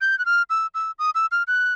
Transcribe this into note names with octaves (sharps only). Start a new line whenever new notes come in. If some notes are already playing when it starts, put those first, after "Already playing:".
G6
F#6
F6
E6
E6
D#6
E6
F6
F#6